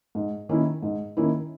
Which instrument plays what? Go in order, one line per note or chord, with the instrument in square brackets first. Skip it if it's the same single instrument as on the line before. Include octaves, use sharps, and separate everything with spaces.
[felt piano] G#2
D#3 A#3 C#4 E4
G#2
D#3 A#3 C#4 E4